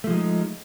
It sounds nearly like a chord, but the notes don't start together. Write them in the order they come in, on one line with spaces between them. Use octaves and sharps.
A3 F3 G#3 D#4